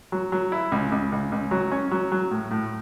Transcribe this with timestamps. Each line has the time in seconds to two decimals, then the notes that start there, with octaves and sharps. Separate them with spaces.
0.12 F#3
0.32 F#3
0.52 E4
0.72 C#2
0.92 C#2
1.12 C#2
1.32 C#2
1.51 F#3
1.72 C#4
1.91 F#3
2.12 F#3
2.31 A2
2.51 A2